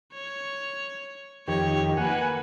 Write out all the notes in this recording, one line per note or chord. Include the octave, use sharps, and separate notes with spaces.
C#5
F2 D#3 G4 C#5
A#3 B4 F#5 G#5